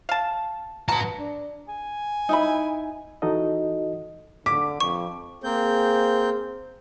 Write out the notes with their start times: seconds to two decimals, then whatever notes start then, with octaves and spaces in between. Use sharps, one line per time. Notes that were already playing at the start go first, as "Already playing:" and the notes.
0.09 F5 A5
0.89 B2 D3 B4 A5 A#5
1.17 D4
1.68 G#5
2.29 D#4 E4 B5
3.22 E3 D#4 F#4 A4 D#5
4.46 D3 D6 B6
4.80 F2 C#6
5.44 A#3 C4 G#4 C5 G6